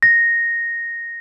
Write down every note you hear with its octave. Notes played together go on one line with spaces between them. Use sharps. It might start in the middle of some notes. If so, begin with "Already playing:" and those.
A#6